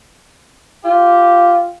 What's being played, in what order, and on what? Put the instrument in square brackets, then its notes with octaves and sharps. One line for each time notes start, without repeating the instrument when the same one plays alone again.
[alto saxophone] F4 [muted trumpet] G4